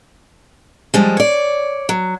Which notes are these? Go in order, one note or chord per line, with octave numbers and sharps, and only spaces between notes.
F3 G3 G#3
C#5 D5
F#3